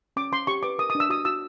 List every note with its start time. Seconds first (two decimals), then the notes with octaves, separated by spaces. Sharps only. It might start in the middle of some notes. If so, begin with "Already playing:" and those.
0.16 C#4 D6
0.32 C#4 C6
0.47 G4 C#6
0.63 B4 D6
0.78 A#4 D#6
0.90 D#6
0.95 D4
1.00 E6
1.09 F#4 D#6
1.25 F#4 E6